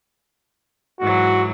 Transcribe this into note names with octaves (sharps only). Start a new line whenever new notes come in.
G#2 E3 F#3 F#4